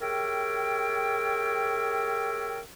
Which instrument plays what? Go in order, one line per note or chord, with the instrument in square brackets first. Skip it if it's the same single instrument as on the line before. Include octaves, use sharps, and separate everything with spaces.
[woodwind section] G4 G#4 A#4 C#5 E5 G5